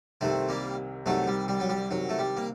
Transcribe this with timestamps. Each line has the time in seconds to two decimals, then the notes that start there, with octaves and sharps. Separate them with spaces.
0.21 C2 C3 D#3 A3 C4
0.49 G3 A#3
1.06 C2 C3 D#3 F#3 A3
1.27 G3
1.48 G3
1.60 F#3
1.69 G3
1.90 C2 C3 D#3 F#3
2.09 A3
2.19 G3
2.37 A#3